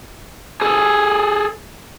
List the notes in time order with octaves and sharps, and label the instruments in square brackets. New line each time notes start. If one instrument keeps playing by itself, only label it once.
[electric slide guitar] G#4 A4